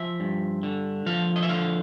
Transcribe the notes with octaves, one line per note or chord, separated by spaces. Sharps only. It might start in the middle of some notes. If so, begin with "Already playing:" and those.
Already playing: F3 E5
G2
D3
F3 F5
D#5
E5
D3 F5